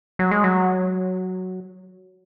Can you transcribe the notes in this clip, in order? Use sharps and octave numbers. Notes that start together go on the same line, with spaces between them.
F#3
G#3
F#3